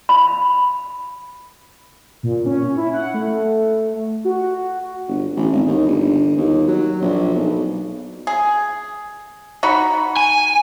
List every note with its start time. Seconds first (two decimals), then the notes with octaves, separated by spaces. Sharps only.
0.09 B5
2.23 A#2
2.46 C#4
2.77 E4
2.94 F#5
3.14 A3
4.25 F#4
5.08 G1
5.36 A1
5.52 G#1
5.68 D#2
5.86 G1
6.37 D#2
6.68 F#3
7.02 A#1
7.34 B1
8.27 G#4
9.63 D#4 F#4 B5
10.17 G#5